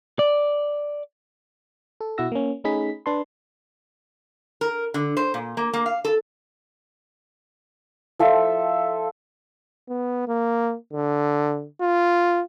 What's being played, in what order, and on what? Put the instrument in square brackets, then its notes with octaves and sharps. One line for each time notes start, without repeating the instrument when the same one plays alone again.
[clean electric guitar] D5
[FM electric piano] A4
B2 E4 F#4 F#5 E6 A#6
A#3 C#4
A3 C#4 D#4 G#4 B5 B6
D4 B4 A5 C6
[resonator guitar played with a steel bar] A#4
D3
C5
A#2
A#3
A#3
F5
A4
[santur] F3 A4 E5
[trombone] B3
A#3
D3
F4